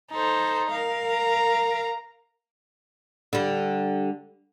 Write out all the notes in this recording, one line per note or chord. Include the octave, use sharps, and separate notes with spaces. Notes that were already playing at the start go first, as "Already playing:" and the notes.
D#4 A4 C5
A#4 F5
A#5
D3 G3